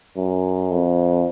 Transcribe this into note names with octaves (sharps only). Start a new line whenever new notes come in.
F#2
F2